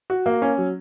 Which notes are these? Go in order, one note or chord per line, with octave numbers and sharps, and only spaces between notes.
F#4
A#3
C#4
F#3